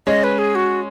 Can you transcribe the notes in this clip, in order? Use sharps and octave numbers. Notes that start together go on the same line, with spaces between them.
G#3 C#4 D#5
B4
G#4
F#4